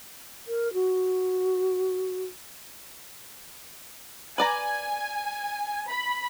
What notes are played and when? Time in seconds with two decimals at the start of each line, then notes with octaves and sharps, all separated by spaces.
0.47 A#4
0.73 F#4
4.38 B4 D5 G#5 A#5
5.89 B5